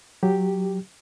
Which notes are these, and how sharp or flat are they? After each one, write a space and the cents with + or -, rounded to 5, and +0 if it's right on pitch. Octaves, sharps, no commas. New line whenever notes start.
F#3 +0 G4 +0